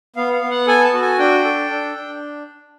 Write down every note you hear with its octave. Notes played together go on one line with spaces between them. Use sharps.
B3 F5
F5
B3
F#5
A4 G#5
A5
F#4
G#5
D4 G5
A4
D4
D4